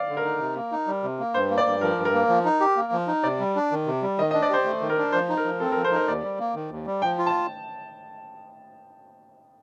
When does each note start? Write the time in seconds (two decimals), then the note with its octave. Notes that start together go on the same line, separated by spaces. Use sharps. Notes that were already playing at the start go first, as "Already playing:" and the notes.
Already playing: D5 F5
0.09 D3
0.17 A#4
0.24 D#4
0.40 C3
0.56 A#3
0.72 D#4
0.87 G3
1.03 C3
1.19 A#3
1.34 G2 C5
1.50 A#3
1.58 D5
1.66 G2
1.81 F3 A#4
1.98 G2
2.05 A#4
2.14 A#3
2.29 F3
2.45 D#4
2.60 G4
2.77 A#3
2.92 F3
3.07 D#4
3.24 C3 D5
3.39 G3
3.56 D4
3.71 D#3
3.86 C3
4.02 G3
4.19 D#3 D#5
4.31 D#5
4.34 D4
4.42 D5
4.50 G4 C5
4.66 A3
4.81 D#3
4.90 A#4
4.97 D4
5.12 F3 C5
5.29 D#4
5.37 A#4
5.44 F3
5.60 C4 A4
5.72 A#4
5.76 F3
5.84 C5
5.92 D#4 A#4
6.08 D#2 D5
6.23 G3
6.39 A#3
6.55 D#3
6.71 D#2
6.86 G3
7.02 F3 G5
7.18 F4
7.26 A5